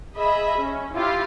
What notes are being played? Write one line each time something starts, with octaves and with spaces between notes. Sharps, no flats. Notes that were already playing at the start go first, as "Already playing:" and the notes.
G#4 D#5 E5 B5
C#4
E4 F4 G4